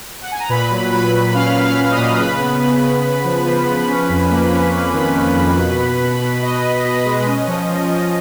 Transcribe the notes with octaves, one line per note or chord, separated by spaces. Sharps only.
F#5
G#5
A#5
A#2 B4 B5
F#3
F#3 B4 B5
A#2
C#4 F5 F6
F#3
F5 F6
C#4
D#5 D#6
A#2
C#3 B4 B5
B3
C#3
C#3
C#3
F3
F3
F3
C#4
F2
A#3
C#4
A#3
D#3
D#3
F2
B2
B2
B2
B2
B2 D#5
B2
B2 D#5
G#3
C#4
F3
F3
F3